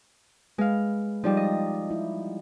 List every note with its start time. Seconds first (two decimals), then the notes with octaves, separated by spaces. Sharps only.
0.58 G#3 B4 F5
1.24 F3 G3 G#3 D#4 D5
1.37 D#5
1.90 E4